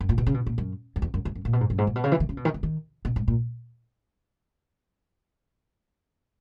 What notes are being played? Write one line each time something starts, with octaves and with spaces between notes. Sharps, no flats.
F#2
A#2
B2
C#3
B2
A#2
F#2
F#2
E2
F#2
E2
F#2
A#2
B2
G#2
F#2
G#2
A#2
B2
C#3
E3
D#3
C#3
B2
D#3
E3
D#3
B2
G#2
A#2